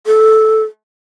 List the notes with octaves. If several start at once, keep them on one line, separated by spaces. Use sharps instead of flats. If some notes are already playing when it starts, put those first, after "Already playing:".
A4